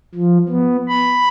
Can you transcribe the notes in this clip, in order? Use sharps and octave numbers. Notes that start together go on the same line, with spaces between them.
F3
B3
B5